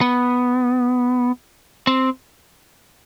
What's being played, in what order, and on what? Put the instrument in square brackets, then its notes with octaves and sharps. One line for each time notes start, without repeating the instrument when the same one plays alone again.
[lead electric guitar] B3
C4